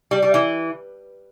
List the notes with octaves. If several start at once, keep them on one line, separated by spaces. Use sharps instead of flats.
G3
G3
E3